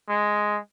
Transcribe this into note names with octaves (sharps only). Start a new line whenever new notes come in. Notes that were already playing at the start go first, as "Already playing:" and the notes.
G#3